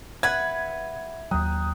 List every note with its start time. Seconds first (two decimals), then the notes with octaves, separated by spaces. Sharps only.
0.23 B4 E5 F#5 G#6
1.31 D#2 F#3 G5 A#5 D#6 F#6